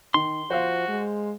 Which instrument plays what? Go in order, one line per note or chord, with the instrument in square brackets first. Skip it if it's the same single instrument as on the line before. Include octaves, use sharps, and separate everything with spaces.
[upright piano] D#3 [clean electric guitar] C6
[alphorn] F3 [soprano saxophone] F#4 [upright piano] C5 F5
[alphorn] G#3